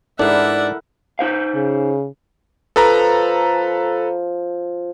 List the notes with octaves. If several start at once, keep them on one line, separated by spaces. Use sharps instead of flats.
G#2 D4 E4 A4 A#4 D5 E5 F#5
D#4 C5 F5
C#3
F3 A4 B4 A#5